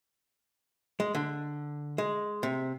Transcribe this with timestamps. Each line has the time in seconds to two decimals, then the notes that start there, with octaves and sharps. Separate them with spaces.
1.00 G#3
1.15 D3
1.98 G#3
2.43 C3